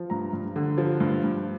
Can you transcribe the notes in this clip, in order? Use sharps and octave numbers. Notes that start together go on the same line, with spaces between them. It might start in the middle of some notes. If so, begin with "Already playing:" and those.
Already playing: F3
G2 A#5
G2
D3
F3
G2
G2